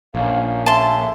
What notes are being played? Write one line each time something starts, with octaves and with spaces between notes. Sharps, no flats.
A#1 A3 A#3 C#4 F5
E5 A5 C6